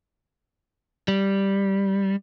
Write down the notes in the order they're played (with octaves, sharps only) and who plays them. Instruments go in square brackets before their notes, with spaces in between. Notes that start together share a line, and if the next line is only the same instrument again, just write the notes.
[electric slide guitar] G3